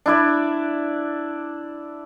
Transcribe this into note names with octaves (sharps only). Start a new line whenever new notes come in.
D4 E4 D5